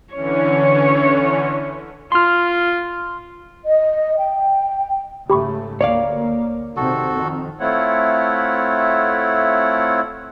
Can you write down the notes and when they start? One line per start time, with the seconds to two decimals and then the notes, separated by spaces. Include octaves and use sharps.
0.13 D3 E3 C#4 C#5
2.12 F4 C6 F6
3.65 D#5
4.17 G5
5.30 G#2 C#3 A3 G4 B5 C#6
5.81 D2 A#3 C#5 D5 F5
6.77 C3 D#3 C4 F#4 A4
7.14 F2 D#3
7.59 A3 C4 E4 F4 C#5 F#5